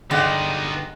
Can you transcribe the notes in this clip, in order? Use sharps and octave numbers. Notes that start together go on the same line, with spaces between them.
G1 G#3 B3 D#4 G4 D5 F5 F#5